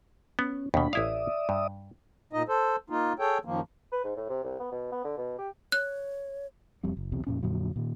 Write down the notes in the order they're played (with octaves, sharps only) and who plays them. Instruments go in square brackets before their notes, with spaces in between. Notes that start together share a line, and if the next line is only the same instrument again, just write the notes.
[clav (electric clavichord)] B3 [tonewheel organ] C#4
[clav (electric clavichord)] D#2 B2 [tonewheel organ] D4 B5
[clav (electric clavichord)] A1 E4 F5 [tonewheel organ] D5 E5 D#6
[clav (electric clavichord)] G2
[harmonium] A#2 D#4 D#5
A4 C5
A#3 D#4 F4
G#4 A4 C#5 G5
F#2 D#3 F3 A#3
[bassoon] B4
G#2
A2
C3
C2
B3
B2
B3
D3
B2
G4
[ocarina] C#5 [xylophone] F#6
[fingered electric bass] E1 F2 G3 C4
F#1
B1 E2 C3
F2 A#2 C#4
F2 A#2 D3 F#3
A#2 D#3